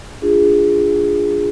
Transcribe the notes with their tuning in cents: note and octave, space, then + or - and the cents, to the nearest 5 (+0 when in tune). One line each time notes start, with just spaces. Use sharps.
D4 +0 F4 +0 G#4 -10